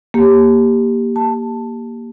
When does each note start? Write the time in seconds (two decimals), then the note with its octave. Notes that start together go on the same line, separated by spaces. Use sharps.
0.14 A#3 G4
1.16 A5